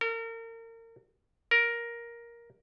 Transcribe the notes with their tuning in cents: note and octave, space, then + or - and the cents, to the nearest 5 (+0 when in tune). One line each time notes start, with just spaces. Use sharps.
A#4 -35
A#4 +10